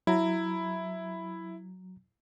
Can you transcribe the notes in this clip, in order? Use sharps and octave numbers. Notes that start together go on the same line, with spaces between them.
F#3 E4 A#5